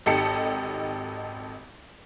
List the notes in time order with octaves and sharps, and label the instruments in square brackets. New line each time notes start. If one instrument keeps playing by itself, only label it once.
[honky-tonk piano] G#1 D#4 G4 A4 A5 C#7